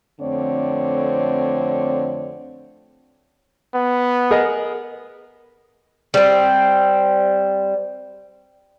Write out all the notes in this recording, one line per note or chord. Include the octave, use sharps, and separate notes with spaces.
F2 D3 A3 C4 C#5 D5
B3
G#4 A#4 D#5
G3 C4